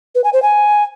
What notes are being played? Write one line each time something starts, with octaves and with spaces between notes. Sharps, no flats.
B4
G#5
C5
G#5